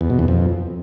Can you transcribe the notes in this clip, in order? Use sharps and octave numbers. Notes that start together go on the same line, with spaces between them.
E2
B2
E2
F2